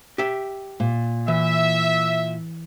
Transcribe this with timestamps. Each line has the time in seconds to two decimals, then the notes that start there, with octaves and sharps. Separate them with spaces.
0.18 G4 E5
0.80 A#2
1.28 E3 E5